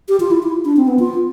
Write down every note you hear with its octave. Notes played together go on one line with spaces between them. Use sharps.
G4
F4
E4
E4
D4
C4
B3
F4